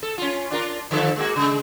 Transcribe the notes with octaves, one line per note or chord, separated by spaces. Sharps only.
A4
C#4 F4
D4 F4 A#4
D3 F3 A4
G#3 A#3 F#4
C#3 G#3